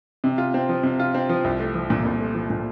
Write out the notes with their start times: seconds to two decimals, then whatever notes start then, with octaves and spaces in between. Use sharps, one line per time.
0.24 C3
0.38 F4
0.54 C4
0.69 F3
0.83 C3
0.99 F4
1.14 C4
1.29 F3
1.44 C2
1.59 A3
1.74 F3
1.90 A#2
2.05 C2
2.21 A3
2.35 F3
2.50 A#2